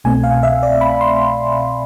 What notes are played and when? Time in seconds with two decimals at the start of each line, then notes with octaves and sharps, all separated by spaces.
0.04 C2 B2 A3 C4 G#5
0.24 F5
0.43 E5
0.63 D5
0.81 B5
1.01 C6